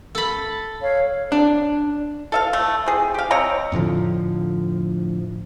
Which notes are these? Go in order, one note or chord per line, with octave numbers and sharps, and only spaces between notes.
A4 B5
C#5 F5
D4
A4 E5 F5
A3
C4 G#4
G4 F5
C4 C#5 D#5 A#5
F2 A2 D3 F3